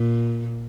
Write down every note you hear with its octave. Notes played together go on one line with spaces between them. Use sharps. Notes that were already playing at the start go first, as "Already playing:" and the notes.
Already playing: A#2